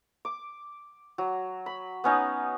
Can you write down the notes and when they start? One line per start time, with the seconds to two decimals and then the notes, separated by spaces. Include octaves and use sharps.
0.25 D6
1.18 F#3
1.66 B5
2.04 B3 C#4 D#4